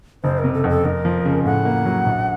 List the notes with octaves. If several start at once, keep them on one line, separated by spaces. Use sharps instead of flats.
F#1 C5
A#4
C3
A4
F2
A4
F2 A#4
F3
C#3
A2 F#5
A#3
F#3
A#1